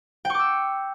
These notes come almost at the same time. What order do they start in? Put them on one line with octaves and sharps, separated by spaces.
G5 C#6 D6 E6